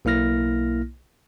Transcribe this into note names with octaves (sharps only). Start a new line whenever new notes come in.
B1 A#3 E4 F6 A#6